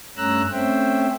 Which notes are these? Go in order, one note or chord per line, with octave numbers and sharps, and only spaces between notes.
G2 A3 C#4 A#5 E6 F#6
A3 C4 C#4 C5 E5 G5